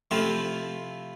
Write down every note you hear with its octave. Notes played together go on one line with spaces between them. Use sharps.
C3 F3 A3 C4 E4 F4